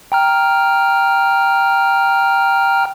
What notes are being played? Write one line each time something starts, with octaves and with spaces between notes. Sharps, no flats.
G5 A#5 F6